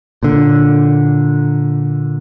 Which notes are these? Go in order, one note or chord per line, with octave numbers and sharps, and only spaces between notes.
A#2 D3